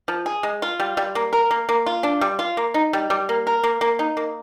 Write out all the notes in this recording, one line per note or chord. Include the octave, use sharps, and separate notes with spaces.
F3
G#4
G#3
F4
G3
G3
A#3
A#4
A#3
A#3
F4
D4
G3
F4
A#3
D#4
G3
G3
A#3
A#4
A#3
A#3
D#4
A#3